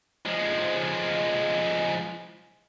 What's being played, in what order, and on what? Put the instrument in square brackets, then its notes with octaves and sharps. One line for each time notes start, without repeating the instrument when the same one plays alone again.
[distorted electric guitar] F3 G#3